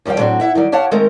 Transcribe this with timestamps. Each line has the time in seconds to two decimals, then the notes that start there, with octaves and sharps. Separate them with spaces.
0.05 D#2 F3 G3 F5 G5
0.19 A2 F#3 C4 D4 F#4
0.40 E4 E5 F#5
0.55 D#3 F#3 G3
0.72 G4 C#5 F5 F#5 A5
0.91 D#3 G#3 A3 C4 A#4